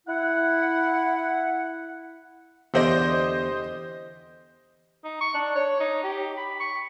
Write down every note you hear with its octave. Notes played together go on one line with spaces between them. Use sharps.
E4 F#5
E2 D3 G4 C5 D5 D#5
D#4
C#6
D4
C#5
D#4
G4
B5
C#6